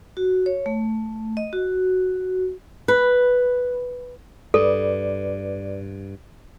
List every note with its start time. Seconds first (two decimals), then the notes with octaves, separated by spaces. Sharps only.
0.17 F#4
0.46 C#5
0.66 A3
1.37 D#5
1.53 F#4
2.88 B4
4.54 G2 A4 B4 D5